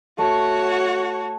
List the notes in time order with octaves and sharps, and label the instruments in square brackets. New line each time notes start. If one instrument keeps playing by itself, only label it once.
[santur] A3 [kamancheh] F#4 C#5